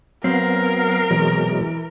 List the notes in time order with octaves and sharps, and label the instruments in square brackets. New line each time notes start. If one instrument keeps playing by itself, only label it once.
[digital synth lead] F#3 [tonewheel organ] B3 F5 [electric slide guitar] C4 [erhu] A#4
[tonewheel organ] B2 F#3 G#3 [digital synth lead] E3